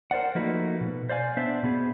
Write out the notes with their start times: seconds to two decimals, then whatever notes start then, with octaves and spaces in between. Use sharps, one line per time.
0.11 A#4 C5 D5 F#5
0.35 F3 A3 A#3 D#4 F#4 B4
0.81 B2
1.09 C5 D5 F5 G#5
1.37 B3 D4 C5 E5
1.63 B2 B3 G#4